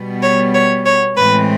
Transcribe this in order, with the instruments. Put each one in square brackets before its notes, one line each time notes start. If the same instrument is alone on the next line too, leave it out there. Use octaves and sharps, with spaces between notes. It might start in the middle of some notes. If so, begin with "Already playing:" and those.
Already playing: [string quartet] B2 G3 B3
C#5
C#5
C#5
A2 E3 G#3 C4 B4